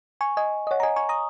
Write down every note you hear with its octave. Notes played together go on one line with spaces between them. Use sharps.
G#5 C#6
D#5 G#5
D#5
C#5 F#5
A#5
D#5 G#5
G#5 C#6
A#5 D#6